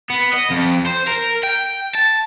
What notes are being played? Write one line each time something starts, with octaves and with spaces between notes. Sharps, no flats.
B3
D#5
F2
C5
A#4
G5
A5